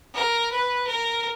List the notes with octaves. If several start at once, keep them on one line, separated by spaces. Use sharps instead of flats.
A#4
B4
A#4